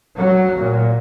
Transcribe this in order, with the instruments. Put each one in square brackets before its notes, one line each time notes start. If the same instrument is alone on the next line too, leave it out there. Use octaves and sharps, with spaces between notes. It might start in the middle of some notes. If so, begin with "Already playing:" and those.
[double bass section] F#3
A#2